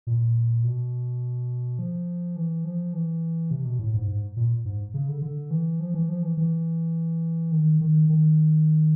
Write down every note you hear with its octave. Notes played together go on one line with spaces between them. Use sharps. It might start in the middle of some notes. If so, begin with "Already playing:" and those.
A#2
B2
F3
E3
F3
E3
C3
B2
A2
G#2
G#2
A#2
G#2
C#3
D3
D3
E3
F3
E3
F3
E3
E3
D#3
D#3
D#3